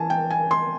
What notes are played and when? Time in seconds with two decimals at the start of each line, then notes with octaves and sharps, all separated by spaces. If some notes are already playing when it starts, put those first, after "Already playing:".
Already playing: E3 G#5 A5
0.10 G5
0.30 G#5
0.51 C6